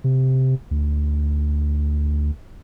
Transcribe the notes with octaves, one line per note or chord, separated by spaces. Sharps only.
C3
D2